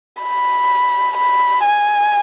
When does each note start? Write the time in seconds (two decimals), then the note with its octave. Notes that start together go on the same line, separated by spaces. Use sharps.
0.23 B5
1.17 B5
1.66 G#5